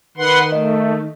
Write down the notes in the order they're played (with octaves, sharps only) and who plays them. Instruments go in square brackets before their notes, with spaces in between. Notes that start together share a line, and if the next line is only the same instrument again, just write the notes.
[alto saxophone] D#3 [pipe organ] B4 F#5 C6
[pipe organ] A3 [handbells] D#5